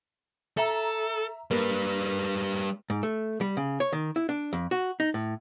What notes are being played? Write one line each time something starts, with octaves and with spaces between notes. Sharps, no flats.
A4 E5 A#5
G3 A#3 B4
G#2
A3
G3
C#3
C#5
D#3
E4
D4
F2
F#4
D#4
A2